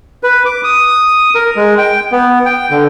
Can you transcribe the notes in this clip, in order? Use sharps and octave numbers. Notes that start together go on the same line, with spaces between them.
B4
D6
D#6
A#4
G#3
G5
B3
G5
D3